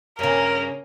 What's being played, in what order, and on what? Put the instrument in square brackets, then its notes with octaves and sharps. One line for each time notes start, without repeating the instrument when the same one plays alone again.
[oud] G2 C#3 [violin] A#3 C#4 [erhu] A#4